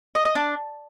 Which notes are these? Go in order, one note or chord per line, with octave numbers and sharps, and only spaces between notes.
D#5
D#5
D4